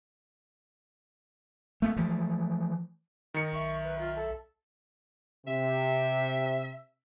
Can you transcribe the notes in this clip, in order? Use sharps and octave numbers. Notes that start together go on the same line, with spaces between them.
A3 B3
E3 F3 A3
D#3 D#4 C#7
B1 E5 C#6
B4
F4
A4
C3 E5